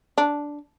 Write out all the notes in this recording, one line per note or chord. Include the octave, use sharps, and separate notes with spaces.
D4